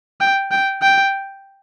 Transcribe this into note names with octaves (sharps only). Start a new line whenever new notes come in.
G5
G5
G5